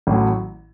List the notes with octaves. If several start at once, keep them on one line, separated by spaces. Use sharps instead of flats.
A1 A2 F#3